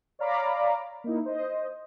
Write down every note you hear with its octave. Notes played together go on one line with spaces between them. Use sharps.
C#5 D5 F5 A#5 B5 D6
A#3 D#4 E4
C5 D#5